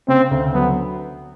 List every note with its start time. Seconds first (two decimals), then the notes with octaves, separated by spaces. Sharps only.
0.08 C#3 C4
0.31 D2
0.54 F#3 B3